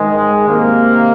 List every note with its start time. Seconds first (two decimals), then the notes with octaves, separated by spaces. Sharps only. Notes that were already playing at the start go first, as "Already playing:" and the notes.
Already playing: G#2 D#3 G#3
0.46 C3 D#3 A#3